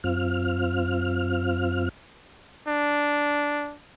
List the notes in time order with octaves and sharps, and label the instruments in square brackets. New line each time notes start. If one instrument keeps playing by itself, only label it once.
[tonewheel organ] F#2 C4 F4 F6
[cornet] D4